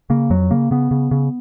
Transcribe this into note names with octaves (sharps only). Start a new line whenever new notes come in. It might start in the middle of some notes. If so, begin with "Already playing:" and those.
C#3 A#3
F2 F#3
C#3 A#3
C#3 B3
C#3
C#3